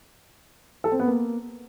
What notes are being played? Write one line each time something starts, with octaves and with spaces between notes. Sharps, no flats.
A4
C4
B3
A#3